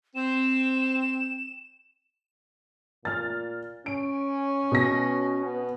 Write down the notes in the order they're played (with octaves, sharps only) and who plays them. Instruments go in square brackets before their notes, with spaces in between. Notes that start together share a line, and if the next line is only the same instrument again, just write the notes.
[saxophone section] C4 [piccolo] E7
[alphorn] A#2 [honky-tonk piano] F6 A6
[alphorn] C#4 [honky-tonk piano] D7
[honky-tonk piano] B2 A#6
[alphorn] B3